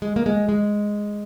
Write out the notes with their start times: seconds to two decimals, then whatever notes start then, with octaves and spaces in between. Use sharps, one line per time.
0.02 G#3
0.16 A#3
0.26 G#3
0.49 G#3